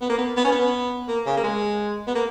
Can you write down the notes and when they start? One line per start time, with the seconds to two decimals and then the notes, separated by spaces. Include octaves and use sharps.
0.01 B3
0.09 A#3
0.18 B3
0.37 B3
0.44 C#4
0.52 B3
1.08 A#3
1.26 C#3
1.37 A#3
1.44 G#3
2.07 B3
2.15 A#3